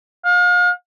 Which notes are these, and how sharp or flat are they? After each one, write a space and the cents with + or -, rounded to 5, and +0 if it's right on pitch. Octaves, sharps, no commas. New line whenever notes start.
F5 +40